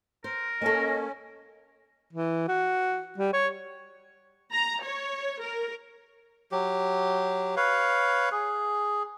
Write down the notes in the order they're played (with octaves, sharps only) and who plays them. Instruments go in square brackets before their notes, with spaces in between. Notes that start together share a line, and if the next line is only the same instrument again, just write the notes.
[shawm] A#4 [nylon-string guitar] C5
[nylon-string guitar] A#3 A4 [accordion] C#4 [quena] D#5
[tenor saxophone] E3
F#4
G3
C#5
[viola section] A#5
C#5
A#4
[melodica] F#3 G4
B4 C#5 F5
G#4